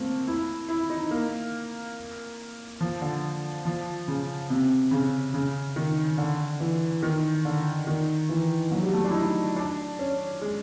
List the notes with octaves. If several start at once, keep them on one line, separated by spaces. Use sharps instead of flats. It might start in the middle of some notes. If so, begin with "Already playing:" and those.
Already playing: A3 A#3 C4
E4
E4
D#4
A#3
F3
D3
F3
C#3
C3
C#3
C#3
D#3
D3
E3
D#3
D3
D#3
E3
F#3
G3
A3
D4
E4
D#4
D4
C#4
G#3